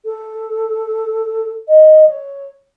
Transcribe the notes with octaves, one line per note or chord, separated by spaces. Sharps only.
A4
D#5
C#5